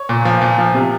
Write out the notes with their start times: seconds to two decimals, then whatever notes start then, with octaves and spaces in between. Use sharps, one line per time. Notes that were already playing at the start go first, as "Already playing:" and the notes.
Already playing: C#5
0.09 A#2
0.25 F3
0.42 A#2
0.58 F3
0.75 C3